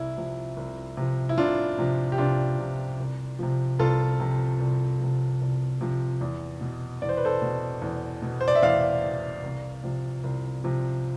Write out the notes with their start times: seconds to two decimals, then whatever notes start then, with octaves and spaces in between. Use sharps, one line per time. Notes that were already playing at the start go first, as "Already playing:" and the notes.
Already playing: C2 E4
0.17 C3 F3
0.57 C2
0.97 C3 F3
1.29 E4
1.37 C2 D4 F4
1.79 C3 F3
2.12 G4
2.18 C2 D4 F4
2.59 C3 F3
2.99 C2
3.39 C3 F3
3.79 C2 F4 A4
4.20 C3 F3
4.60 C2
5.00 C3 F3
5.41 C2
5.81 C3 F3
6.21 E2
6.61 B2
7.02 E2 D5
7.09 C5
7.17 B4
7.25 A4 C5
7.42 B2
7.82 E2
8.22 B2
8.41 C5
8.48 D5
8.55 E5
8.62 E2 D5 F5
9.04 B2
9.44 C2
9.84 C3 F3
10.24 C2
10.64 C3 F3